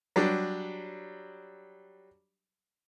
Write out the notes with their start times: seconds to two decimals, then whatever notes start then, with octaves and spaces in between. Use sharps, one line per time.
0.16 F#3 G3 D4